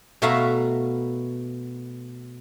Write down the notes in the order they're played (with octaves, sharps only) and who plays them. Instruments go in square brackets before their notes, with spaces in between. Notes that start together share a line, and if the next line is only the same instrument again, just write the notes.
[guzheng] B2 A3 F#4 E5 F5 A#5